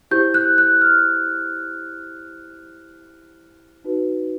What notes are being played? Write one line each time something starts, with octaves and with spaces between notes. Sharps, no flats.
E4 G4 C5 G6
F#6
F#6
F6
D#4 F#4 B4